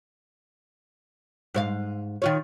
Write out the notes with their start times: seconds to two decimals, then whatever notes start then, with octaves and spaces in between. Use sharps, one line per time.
1.54 G#2 C#5 F5
2.22 D#3 F4 C#5